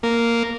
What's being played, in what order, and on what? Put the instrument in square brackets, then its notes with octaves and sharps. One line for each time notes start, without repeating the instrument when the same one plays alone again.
[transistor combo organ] A#3